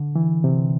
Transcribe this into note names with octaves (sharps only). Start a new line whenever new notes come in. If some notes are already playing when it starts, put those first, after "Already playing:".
Already playing: D3
E3
C3